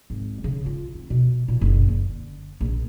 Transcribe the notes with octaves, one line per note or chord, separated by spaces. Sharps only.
G#1
C#3
F4
C4
B2
A#2
F#1
D3
A#1